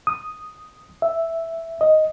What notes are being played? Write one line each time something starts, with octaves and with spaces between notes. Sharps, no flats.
D#6
E5
D#5